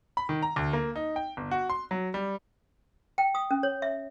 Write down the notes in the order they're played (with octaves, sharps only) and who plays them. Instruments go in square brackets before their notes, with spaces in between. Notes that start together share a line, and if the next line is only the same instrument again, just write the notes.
[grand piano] B5
D#3
A#5
D2
A#3
D#4
G5
G1
F#4
C6
F#3
G3
[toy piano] G5
D#6
C#4
C#5
E5